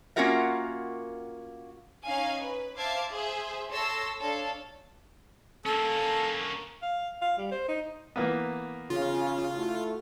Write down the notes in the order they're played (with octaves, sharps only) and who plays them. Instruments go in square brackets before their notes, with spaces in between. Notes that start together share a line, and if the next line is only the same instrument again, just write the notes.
[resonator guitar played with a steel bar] A#3 C#4 F4 F#4 A#4 E5
[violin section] C#4 D#4 F5 G#5
B4
C5 E5 F5 A5 D6 G#6
G#4 C5 E5
A4 C#5 C6 E6 A#6
D4 A4 C#5 F5
[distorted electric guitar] A#3 C#4 [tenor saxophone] A4
[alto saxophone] F5
F5
G3
C5
D#4
[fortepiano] E3 A#3 B3
[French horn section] C#3 [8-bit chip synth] F4
[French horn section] A3 E4 F#4